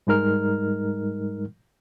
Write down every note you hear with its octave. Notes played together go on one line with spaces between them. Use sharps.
G#2 G3 G#3 D#4 A#4 F6